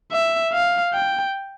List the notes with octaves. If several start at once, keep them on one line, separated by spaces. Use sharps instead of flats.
E5
F5
G5